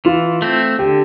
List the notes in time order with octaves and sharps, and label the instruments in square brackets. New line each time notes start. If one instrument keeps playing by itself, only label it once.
[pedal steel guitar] E3 [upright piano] F4
[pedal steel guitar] A3 C4
[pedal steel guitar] D3 [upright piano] G4